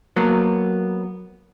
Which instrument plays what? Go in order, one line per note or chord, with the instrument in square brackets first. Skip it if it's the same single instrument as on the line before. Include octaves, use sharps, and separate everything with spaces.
[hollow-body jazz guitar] F#3 A#3 B3